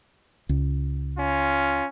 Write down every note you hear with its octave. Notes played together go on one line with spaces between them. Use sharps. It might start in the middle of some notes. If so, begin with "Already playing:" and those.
C#2
C#4 F4